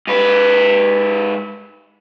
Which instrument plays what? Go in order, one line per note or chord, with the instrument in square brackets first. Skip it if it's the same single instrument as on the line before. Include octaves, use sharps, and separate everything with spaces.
[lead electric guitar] G#2 B4